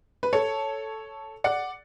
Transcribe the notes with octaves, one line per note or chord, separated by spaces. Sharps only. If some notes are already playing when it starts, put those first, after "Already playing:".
B4
A4 C#5
D5 F#5